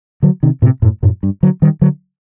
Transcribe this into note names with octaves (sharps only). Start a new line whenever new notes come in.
D3 F#3
C3 D#3
A2 C3
F#2 A2
F#2 A2
G2
D3 F#3
D#3 G3
D3 F#3